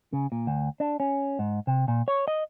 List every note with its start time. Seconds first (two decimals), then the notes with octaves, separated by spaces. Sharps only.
0.13 C#3
0.32 A#2
0.47 D2
0.80 D4
1.00 C#4
1.39 G#2
1.67 C3
1.88 A#2
2.08 C#5
2.28 D#5